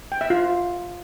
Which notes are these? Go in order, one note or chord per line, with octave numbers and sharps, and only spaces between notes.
G5
E5
F4